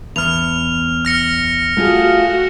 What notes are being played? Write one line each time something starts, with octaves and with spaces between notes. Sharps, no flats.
E2 F6 F7
F6 A#6 C#7
A3 F4 F#4 G#4